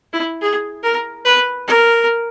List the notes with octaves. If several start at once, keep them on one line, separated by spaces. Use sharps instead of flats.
E4
G#4
A#4
B4
A#4